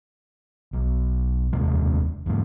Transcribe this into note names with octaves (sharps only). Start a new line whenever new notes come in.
B1
F1 D#2 C3 G#3
E2 G#2